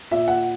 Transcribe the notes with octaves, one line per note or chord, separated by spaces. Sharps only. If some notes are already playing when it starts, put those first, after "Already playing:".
A#2 E5
F#5